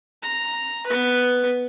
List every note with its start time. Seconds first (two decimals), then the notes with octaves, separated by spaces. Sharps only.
0.23 A#5
0.87 B3 B4